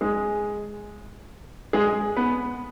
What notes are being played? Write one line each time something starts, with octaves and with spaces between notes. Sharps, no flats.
G#3 G#4
G#3 G#4
B3 B4